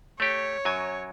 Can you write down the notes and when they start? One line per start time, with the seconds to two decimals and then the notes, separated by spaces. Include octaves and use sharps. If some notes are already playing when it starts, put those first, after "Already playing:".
0.20 A3 G4 C#5
0.65 F#2 F#3 G#5